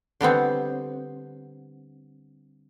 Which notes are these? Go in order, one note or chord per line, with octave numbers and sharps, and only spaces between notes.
D3 G3 B3 C4